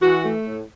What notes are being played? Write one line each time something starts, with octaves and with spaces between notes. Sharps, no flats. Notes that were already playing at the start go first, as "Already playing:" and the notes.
E3 F#4
A3
A2